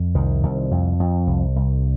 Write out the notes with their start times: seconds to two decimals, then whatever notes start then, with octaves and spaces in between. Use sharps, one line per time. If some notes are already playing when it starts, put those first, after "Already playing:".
Already playing: F2
0.15 C2 D#3
0.43 C2
0.71 F2
1.00 F2
1.27 C2
1.56 C2